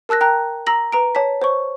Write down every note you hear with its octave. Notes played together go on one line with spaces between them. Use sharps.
A#4 A5 E6 F#6 A#6
G5 A#5 F#6
A#5 E6 A#6 F#7
B4 A#5 D7
C#5 A5 B6
C5 C#5 C#6